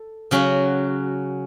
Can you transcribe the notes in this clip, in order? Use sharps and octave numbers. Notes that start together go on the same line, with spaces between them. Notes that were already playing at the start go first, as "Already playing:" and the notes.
Already playing: A4
C#3 F#3 C#4 F#4